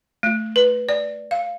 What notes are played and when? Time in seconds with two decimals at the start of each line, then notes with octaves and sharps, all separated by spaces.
0.23 A3
0.56 B4
0.89 D5
1.31 F5